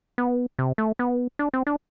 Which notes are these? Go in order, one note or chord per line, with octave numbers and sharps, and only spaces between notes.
B3
C3
A3
B3
D4
C4
D4